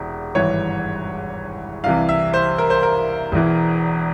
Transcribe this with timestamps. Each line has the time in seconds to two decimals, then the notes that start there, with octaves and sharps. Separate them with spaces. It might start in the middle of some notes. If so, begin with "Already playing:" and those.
Already playing: E1 E2 C3
0.35 G#1 G2 E3 C#5
1.84 C2 C3 E3 F5
2.09 E5
2.34 C5
2.58 A#4
2.70 C5
2.83 A#4
3.32 E1 E2 E3